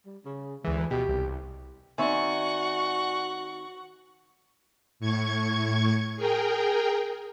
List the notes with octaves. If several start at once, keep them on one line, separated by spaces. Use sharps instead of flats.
G3
C#3
D2 E3 G#3
B2 G4
C2
D#3 C4 F#4 D5 E5 F#5 G#5 C#6
A2 C#6 G#6
G#4 A#4 G5